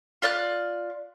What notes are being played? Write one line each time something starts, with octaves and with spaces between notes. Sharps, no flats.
F4 D5 F6 F#6